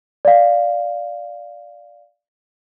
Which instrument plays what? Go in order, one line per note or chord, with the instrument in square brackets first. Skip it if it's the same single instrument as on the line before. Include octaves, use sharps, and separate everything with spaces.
[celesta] D5 F5